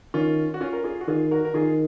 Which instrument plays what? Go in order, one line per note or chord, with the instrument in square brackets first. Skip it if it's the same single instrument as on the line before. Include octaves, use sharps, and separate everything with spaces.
[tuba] D#3 [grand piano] C#4 F4
[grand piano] F#4
C#4 F4
A#4
F4 G#4
F#4
[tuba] D#3 [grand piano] F4 G#4
[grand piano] F#4 A#4
A#4
[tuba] D#3 [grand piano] F4 G#4